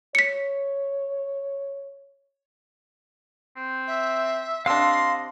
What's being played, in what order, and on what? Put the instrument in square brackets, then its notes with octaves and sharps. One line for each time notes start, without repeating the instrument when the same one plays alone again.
[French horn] C#5 [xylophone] B6 C#7
[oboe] C4
[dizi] E5
[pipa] C3 D4 [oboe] D#5 [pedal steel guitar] F5 E6 [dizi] C6